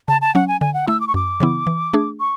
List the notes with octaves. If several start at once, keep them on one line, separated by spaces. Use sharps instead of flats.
C#3 A5
A5
F#3 C#4 F#5
G#5
D3 G#5
F#5
A3 E4 E6
D6
C#6
F#2 D6
C#3 E3 B3 E4
E3
A3 D4 G#4
C#6